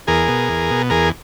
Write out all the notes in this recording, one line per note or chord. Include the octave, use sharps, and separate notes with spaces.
E2 G#4 A#4
B2
E2
B2
E2 G#4 A#4